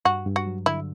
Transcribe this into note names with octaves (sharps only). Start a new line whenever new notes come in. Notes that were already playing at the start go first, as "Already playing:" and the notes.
G2 F#4
G2
F#4
F#3
D3 E4